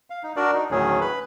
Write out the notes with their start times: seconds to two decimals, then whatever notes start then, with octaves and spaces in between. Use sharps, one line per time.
0.10 F5
0.24 D#4
0.36 D4 F#4 A#4 D5
0.54 D#4
0.71 D2 A2 D#3 F#3 C#4 G#4
1.01 B4 B5